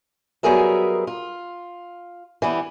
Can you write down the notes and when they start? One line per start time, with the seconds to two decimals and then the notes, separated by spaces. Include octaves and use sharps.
0.43 F#3 G3 B3 G#4 A#4 E5
1.07 F4
2.42 E3 G3 B3